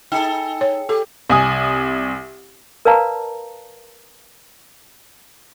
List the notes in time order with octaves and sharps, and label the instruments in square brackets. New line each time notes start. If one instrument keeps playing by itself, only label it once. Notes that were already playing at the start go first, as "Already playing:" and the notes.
[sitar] D#4 G#4 A4 [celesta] G5 C#7
[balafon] C#5
[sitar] G4 [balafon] A4
[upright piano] C2 G#5 D#6
[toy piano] A#4 B4 D5 F5 A5 A#5